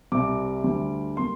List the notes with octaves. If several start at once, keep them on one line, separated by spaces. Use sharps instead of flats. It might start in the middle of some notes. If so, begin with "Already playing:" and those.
C2 C3 G3 C4 D6
D2 D3 G3 D4
G3 A#3 C6